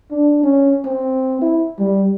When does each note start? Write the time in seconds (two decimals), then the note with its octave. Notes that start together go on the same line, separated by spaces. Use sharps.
0.11 D4
0.44 C#4
0.85 C4
1.42 E4
1.79 G3